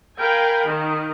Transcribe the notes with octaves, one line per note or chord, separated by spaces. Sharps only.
A#4 F5 G5 G#5 B5
D#3